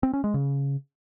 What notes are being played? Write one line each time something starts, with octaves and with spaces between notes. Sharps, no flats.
C4
C#4
G#3
C#3